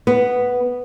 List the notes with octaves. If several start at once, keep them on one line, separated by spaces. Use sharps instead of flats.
B3